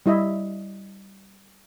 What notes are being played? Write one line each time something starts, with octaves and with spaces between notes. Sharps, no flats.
G3 E4 D#5 E5